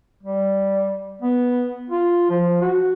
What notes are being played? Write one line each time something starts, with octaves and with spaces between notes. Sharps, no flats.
G3
B3
F4
F3
F#4